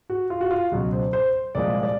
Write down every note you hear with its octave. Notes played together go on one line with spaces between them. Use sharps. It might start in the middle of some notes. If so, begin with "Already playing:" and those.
F#4
F4
F#4
F4
C#2 B2 F#3 F#4
C5
C5
C2 A#2 F3 G#3 D5
D5